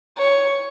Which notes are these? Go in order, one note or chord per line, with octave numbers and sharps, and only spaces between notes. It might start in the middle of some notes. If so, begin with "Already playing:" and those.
C#5